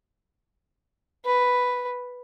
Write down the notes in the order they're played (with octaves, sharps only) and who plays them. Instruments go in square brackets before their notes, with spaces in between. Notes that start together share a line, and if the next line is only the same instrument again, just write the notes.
[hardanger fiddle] B4